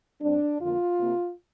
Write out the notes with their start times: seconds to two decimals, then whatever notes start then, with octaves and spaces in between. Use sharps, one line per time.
0.21 G2 G3 C4 D4
0.59 F2 D3 A#3 F4
0.99 C3 A#3